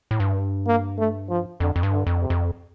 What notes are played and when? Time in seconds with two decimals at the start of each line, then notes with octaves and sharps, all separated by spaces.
0.11 A2
0.20 G2
0.67 A#3
0.98 A3
1.29 F3
1.60 F2 D3
1.76 F2
1.83 G2
1.91 D3
2.07 F2
2.22 C3
2.30 F2